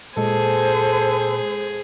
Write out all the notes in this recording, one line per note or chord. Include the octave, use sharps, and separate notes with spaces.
A#2 G#3 G#4 A4 C5 G#5